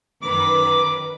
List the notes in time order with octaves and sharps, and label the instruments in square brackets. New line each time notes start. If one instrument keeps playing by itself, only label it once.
[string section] F#2 D#3 B4 [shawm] D6